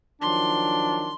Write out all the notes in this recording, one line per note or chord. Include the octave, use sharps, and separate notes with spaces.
D#3 F3 F#3 D4 C6